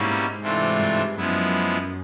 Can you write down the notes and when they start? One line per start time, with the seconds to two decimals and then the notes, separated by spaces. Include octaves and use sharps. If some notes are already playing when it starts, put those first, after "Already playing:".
Already playing: G#2 B2 G3 A#3 C#4 E4
0.41 C3 E3 A3 D4 F4
0.79 G2
1.17 F#2 F3 G#3 B3 E4